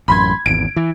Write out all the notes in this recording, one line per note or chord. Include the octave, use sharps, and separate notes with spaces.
A1 F#2 B5 C6 G#6
G#1 E2 D7
E3